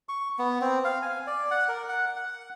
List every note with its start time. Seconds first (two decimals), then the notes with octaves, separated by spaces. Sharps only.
0.09 C#6
0.39 B3
0.61 C4
0.84 F5
1.02 G#5
1.27 D5
1.51 F#5
1.68 A#4
1.89 F#5
2.16 F#5